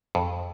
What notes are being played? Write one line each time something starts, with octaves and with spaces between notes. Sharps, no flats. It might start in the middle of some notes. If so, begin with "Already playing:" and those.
F2